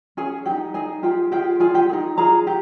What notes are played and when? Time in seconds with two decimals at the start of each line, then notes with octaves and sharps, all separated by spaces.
0.17 C#4 G#4 G#5
0.46 G4 G#4 G5
0.51 D#4
0.74 D#4 G#4 G#5
1.03 F4 G4 G#4 G5
1.32 F4 G4 G#4 G5
1.60 F4 G#4 G#5
1.74 G4 G5
1.89 G#4
1.93 D#4
2.18 F4 G#4 A#5
2.47 G4